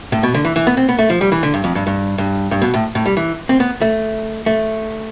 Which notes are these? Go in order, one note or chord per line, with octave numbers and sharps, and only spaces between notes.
A2
B2
D3
E3
E3
B3
C4
B3
A3
F3
G3
E3
D3
G2
F2
G2
G2
G2
G2
B2
A2
A2
G3
E3
C4
B3
A3
A3